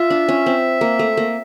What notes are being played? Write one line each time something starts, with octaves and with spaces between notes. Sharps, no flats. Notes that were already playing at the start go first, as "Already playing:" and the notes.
Already playing: F4 E5
D4
C#4
C4
A#3
A3
A#3